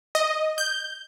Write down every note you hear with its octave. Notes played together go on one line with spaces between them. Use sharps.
D#5
G6